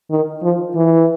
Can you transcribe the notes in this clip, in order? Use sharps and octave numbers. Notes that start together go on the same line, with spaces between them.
D#3
F3
E3